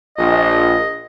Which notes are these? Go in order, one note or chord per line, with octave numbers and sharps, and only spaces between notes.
A#1 D#5